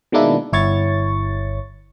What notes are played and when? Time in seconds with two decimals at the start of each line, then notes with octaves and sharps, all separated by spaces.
0.12 B2 D#3 G#3 A#3 D4 E4
0.53 G1 E4 C#5 C#6 A6